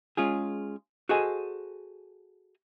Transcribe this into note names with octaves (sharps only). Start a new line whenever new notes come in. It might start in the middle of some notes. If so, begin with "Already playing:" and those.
G#3 C#4 F4 G#4
F#4 G#4 A4 C5 D#5 G#5